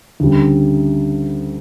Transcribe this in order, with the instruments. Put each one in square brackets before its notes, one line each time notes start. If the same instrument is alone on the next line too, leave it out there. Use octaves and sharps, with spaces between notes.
[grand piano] D2 C#3 G3